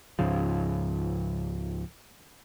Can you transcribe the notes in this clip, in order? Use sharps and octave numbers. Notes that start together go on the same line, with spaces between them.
C#2 G#2 C#3 F3